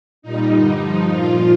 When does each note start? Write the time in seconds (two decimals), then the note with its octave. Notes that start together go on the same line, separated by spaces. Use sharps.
0.22 A#2 G3 D#4
0.51 G2 D3 G3
0.80 G2 F3
1.08 A#2 F3 F4